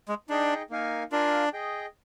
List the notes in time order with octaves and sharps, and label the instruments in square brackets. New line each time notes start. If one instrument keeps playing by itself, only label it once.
[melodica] G#3
[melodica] D4 [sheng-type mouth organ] D#4 G#4 D#5 G5
[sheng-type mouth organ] A#3 D#4 A#4 F5 G#5
[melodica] D4 [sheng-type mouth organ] F4 A#4 F5 G#5
[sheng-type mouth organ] G#4 D#5 G5